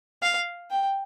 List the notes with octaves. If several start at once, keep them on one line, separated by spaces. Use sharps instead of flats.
F5
G5